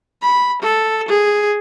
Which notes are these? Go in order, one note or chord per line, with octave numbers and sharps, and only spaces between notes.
B5
A4
G#4